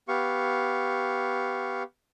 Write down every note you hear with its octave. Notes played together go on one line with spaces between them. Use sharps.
B3 G4 F5 C#6